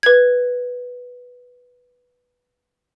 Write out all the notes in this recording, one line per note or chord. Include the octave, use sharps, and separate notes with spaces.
B4 G#6